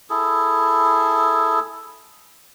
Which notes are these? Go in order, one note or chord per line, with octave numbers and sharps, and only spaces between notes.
E4 G#4 A4